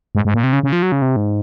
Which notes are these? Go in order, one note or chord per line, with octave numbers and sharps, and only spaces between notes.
G#2
G#2
A#2
C3
C#3
C#3
F3
F#3
C#3
C3
G#2